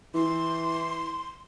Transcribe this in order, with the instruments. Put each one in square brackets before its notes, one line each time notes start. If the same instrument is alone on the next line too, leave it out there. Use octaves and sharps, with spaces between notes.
[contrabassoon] E3 [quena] C6